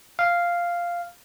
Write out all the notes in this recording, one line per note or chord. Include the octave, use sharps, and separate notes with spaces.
F5